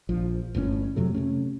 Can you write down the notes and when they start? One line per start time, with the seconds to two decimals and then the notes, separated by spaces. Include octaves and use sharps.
0.09 A#1 F3
0.55 G1 A2 C#3 C#4
0.96 F2 C3 F#3 A3
1.14 C3 A3 C#4